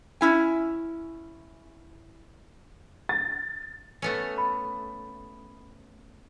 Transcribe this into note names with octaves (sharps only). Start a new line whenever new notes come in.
C#4 E4 G#5
A6
A3 B3 C#4
B5